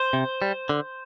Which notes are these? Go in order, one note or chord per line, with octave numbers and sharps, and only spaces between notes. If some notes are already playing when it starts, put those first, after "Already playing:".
Already playing: C5
C3
G3
D3